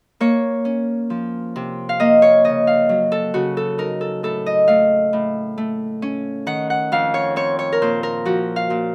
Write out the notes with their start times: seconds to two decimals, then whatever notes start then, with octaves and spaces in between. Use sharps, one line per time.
0.20 A#3 C#5
0.65 C#4
1.10 F3
1.56 C3
1.89 F5
2.00 A#3 D#5
2.22 C#5
2.44 C#3 D#5
2.67 F5
2.89 F#3
3.12 A4
3.34 C#3 F#4
3.57 A4
3.78 D#4 A#4
4.01 A4
4.23 A2 A4
4.46 D#5
4.68 A3 F5
5.13 A2
5.58 A3
6.02 C#4
6.46 D#3 F#5
6.70 F#5
6.92 F2 F5
7.14 C#5
7.36 C4 C#5
7.59 C#5
7.72 A#4
7.82 A#2 C5
8.03 A#4
8.25 F3 F#4
8.56 F5
8.70 A#2